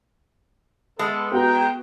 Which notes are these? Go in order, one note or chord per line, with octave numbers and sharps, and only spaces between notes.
G#3 B3 A4
B3 F#4 G5 A#5